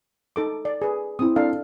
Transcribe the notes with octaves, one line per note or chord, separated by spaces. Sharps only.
D#4 A4 D6
D5
G#4 B4
C4 E4 D#6
D4 A4 F5